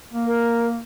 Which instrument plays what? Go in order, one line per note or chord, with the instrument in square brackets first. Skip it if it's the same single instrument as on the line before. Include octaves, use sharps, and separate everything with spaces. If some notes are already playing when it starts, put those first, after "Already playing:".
[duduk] A#3
[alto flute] A#4